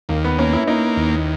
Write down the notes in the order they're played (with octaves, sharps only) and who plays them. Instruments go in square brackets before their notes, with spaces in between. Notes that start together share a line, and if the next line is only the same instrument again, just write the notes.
[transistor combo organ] D#2 [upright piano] A#3
[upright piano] B3
[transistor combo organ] A#3 [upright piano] C#4
[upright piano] E4
[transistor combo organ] A#3 [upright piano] D#4
[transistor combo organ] D#2